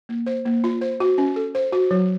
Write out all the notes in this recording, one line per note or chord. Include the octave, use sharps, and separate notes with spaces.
A#3
C5
A#3
F4
C5
F#4
C#4
A4
C5
F#4
F#3